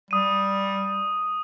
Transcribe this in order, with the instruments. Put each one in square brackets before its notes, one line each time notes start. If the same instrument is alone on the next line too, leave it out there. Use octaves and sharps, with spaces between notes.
[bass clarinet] G3 [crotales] D#6 D#7